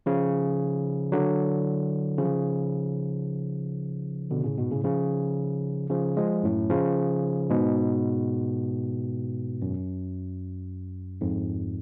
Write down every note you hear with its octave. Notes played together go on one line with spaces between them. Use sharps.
C#3 F3
D3 F#3
C#3 F3
B2 D3
A2 C#3
G#2 B2
A2 C#3
C#3 F3
C#3 F3
F3 G#3
F#2 A2
C#3 F3
G#2 B2
F#2
F2 G#2